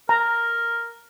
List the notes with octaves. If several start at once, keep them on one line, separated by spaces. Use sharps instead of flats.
A#4 A#5